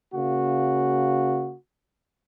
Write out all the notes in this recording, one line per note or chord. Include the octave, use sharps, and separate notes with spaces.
C#3 A#3 F#4